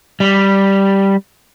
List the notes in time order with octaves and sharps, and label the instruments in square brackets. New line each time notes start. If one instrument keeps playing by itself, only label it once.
[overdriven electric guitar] G3